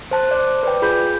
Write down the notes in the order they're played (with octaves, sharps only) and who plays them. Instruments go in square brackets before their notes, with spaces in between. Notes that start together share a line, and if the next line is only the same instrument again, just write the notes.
[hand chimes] C5 A5 F#6
C5 D5
B4 D5 G5
F4 G#4 B5 G6